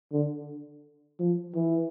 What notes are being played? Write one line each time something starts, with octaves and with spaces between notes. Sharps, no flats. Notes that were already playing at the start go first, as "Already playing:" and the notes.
D3
F3
E3